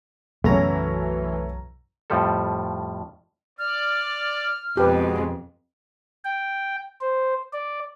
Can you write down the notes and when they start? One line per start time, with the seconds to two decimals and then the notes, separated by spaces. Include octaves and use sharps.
0.44 B1 F#2 C#3 E3 A3 C#4 F#4 A#5
2.10 F2 A2 F3 G3 A4
3.59 D5 F6
4.77 F2 B2 G#3 G4 B4
6.25 G5
7.01 C5
7.53 D5